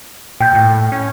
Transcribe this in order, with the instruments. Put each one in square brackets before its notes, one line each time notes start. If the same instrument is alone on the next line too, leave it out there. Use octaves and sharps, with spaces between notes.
[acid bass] A#2 [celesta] G5 G6
[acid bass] A2
C#4